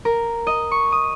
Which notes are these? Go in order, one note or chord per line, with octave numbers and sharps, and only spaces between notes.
A#4
D#5
C#6
D#6